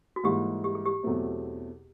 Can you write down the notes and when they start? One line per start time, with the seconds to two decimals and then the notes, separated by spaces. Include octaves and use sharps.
0.16 F#4
0.24 G#2 E3 G3 A#3 G4
0.64 G4
0.75 G#4
0.86 G4
1.03 E2 B2 F#3 A3 C4